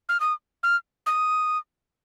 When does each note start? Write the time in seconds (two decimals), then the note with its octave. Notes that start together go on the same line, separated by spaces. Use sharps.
0.09 F6
0.20 D#6
0.63 F6
1.06 D#6